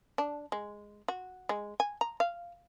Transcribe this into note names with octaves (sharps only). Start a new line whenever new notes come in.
D4
G#3
F#4
G#3
G#5
A#5
F5